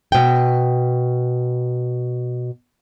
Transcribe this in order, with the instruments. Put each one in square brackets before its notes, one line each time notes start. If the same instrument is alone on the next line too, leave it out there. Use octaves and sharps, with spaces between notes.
[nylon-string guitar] B2 G5